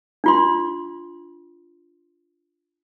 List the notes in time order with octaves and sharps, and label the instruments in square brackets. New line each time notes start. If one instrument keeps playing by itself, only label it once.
[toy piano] D4 F4 C6